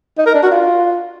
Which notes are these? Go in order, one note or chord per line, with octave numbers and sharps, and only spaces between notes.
D#4
A#4
D4
F#4
F4